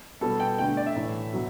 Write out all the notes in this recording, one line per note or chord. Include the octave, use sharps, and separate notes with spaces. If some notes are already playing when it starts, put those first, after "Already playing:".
B2 G3 B3 A4
G5
D3 A3 G5
D5
E5
A2 E3 A3
B2 F#3